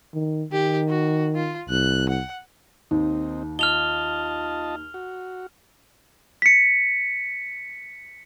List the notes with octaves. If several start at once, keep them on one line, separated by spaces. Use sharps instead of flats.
D#3
D#3 G4
F#4
F4
C2 F#6
F#5
D#2 C4 D#4
F4 D#5 A5 F6 F7 G7
F#4
B6 C#7